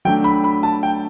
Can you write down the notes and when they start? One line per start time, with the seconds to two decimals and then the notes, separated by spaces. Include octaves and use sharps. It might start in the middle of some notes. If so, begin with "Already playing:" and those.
0.05 F#3 A3 D4 G5
0.24 B5
0.44 B5
0.63 A5
0.83 G5